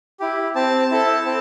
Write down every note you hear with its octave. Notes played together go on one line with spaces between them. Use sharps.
E4 G4
C4 A5
E4 A4
C4